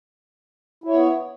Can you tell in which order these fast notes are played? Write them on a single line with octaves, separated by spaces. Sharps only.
E4 C#5 B3